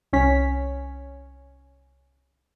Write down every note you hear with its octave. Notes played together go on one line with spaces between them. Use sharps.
C2 C#4 B6